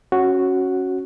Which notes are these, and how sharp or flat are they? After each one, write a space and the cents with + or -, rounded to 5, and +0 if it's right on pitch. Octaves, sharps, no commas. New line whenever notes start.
C#4 -15 F#4 +0